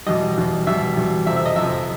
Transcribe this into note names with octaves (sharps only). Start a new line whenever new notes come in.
E2 B2 G3 D#5
E2 B2 G3
E2 B2 G3 E5
E2 B2 G3
F2 C3 F3 E5
E5
D#5
F2 C3 F3 E5